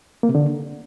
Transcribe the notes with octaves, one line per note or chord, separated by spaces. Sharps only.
A#3
C3
D3